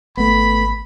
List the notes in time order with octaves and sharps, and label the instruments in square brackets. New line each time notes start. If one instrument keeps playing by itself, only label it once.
[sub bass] G#1 [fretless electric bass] A3 B3 [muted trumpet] B5